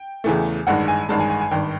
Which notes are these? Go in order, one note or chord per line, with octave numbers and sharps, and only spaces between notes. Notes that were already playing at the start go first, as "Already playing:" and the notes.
Already playing: G5
E2 C#3 E3 A3
A1 G2 D#3 G#3 F#5
G#5
A1 G2 D#3 G#3 A5
G#5
G#5
G#5
G#1 G2 D#3 G5